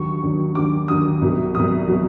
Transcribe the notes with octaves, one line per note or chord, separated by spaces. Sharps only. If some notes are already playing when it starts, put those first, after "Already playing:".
Already playing: D#2 D3 F#3 C#6
D#2 D3 F#3
D#2 D3 F#3 D6
D#2 D3 F#3 D#6
C2 B2 F#3
C2 B2 F#3 D#6
B2 F#3